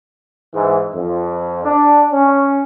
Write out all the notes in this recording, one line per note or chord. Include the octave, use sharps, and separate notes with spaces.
G#2 E3
F2
D4
C#4